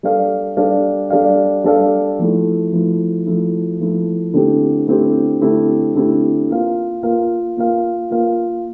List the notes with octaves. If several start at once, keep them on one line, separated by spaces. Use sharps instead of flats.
G3 D4 A4 D5 F5
G3 D4 A4 D5 F5
G3 D4 A4 D5 F5
G3 D4 A4 D5 F5
F3 A3 E4
F3 A3 E4
F3 A3 E4
F3 A3 E4
D3 A3 C4 E4 G4
D3 A3 C4 E4 G4
D3 A3 C4 E4 G4
D3 A3 C4 E4 G4
A#3 F4 A#4 F5
A#3 F4 A#4 F5
A#3 F4 A#4 F5
A#3 F4 A#4 F5